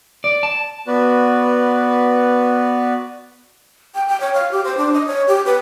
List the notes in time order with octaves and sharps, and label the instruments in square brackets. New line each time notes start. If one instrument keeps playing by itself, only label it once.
[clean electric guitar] D5
A5
[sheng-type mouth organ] B3 F#4 B4 D5
[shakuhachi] G5
G5
C#5
F5
G4
C5
D4
D#5
C#5
G4
B4